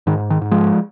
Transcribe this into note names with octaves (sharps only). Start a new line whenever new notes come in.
G#2 D#3
D#3
G#2
F3 G#3